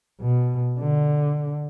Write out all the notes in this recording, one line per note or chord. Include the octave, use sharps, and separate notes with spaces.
B2
D3